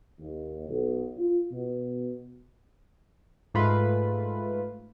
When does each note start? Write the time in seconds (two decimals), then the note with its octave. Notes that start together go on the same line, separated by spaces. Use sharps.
0.20 D#2
0.69 B1
1.17 F4
1.51 B2
3.54 G#2 A3 F4 B4